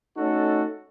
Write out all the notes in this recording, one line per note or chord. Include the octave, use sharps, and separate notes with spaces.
A3 C#4 D#4 F#4 A4